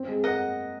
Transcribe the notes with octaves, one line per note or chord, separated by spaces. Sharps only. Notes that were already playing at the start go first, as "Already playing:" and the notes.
Already playing: C4
G#3
A#4 D#5 F#5